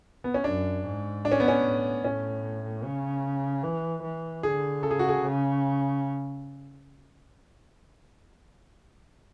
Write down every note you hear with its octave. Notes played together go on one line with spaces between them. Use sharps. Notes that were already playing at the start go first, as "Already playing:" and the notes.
B3
C#4
F#2 D4
G#2
A2 D4
C#4
B3
C#4
A2
A2 C#4
C#3
E3
E3
D3 G#4
C#3 A4
G#4
F#4
G#4
C#3